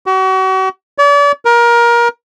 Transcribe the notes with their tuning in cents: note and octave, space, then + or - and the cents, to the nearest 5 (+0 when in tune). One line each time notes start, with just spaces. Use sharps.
F#4 +40
D5 -40
A#4 +25